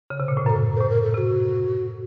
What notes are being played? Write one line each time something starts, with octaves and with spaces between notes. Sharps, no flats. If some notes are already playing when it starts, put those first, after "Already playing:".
C#3
C3
A#2
A2
F#2 A4 A#4
A2 C5
A#4
A4
C3 F#4 A4